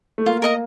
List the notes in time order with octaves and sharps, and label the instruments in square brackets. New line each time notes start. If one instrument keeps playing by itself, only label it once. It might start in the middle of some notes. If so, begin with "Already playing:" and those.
[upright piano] A3
[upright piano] A#3 [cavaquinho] F4
[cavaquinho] A#4 D#5 A#5